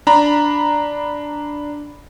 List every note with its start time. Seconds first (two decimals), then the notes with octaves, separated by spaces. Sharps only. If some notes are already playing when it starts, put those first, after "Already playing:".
0.07 D4 A#5 B5